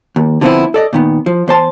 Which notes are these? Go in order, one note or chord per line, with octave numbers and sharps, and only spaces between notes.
D#2
D3 F3 A3 B3 C4 E4
A4 D5 D#5
A#2 D#3 B3
F3
E2 C5 A5 C6